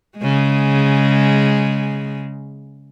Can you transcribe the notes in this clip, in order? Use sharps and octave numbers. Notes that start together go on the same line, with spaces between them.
C#3 G#3